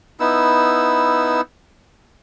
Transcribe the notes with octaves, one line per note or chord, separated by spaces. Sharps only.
B3 D#4 E4 E6